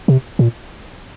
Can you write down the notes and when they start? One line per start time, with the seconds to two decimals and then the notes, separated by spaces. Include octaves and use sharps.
0.08 C3
0.39 A#2